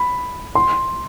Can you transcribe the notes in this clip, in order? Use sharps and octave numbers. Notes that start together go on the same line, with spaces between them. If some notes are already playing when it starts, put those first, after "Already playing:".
Already playing: B5
C6